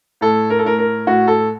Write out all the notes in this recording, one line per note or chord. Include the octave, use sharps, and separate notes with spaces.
A2 A4
A#4
A4
A2 A#4
A#4
A2 F#4
A4